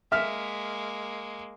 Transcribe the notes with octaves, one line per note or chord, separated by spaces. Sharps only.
G#3 A#3 E5 F6